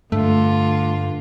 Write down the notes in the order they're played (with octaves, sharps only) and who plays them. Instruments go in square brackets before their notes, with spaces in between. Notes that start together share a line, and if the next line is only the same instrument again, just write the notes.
[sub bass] G2 [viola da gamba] D3 F4 [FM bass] A3